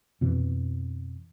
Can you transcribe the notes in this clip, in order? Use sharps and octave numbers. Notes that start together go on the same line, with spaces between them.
F2 B2 E3